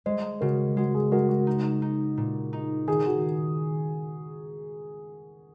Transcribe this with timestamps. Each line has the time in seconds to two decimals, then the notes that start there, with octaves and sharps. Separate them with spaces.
0.06 G#3 C5 D#5
0.41 C#3 F#4 A#4
0.77 G#3 F#4
0.95 G#4
1.12 G#3 F#4 A#4
1.29 F#4
1.47 D#4
1.82 D#4
2.17 A#2
2.53 D#4
2.87 D#3 G#4
3.06 F#4